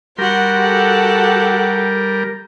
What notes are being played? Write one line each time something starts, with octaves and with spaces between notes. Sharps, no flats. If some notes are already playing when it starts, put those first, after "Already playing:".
G3 F#4 A#4 F#5 C6
G4 A4